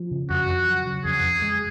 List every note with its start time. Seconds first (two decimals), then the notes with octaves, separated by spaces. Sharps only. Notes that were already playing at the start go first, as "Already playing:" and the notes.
Already playing: F3
0.11 C#3
0.30 F2 F#4
0.48 F2
0.67 F#3
0.85 C#3
1.04 F2 G#4
1.24 F2
1.42 G#3